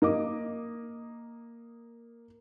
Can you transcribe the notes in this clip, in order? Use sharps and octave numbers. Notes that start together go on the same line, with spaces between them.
A#3 D#5 D6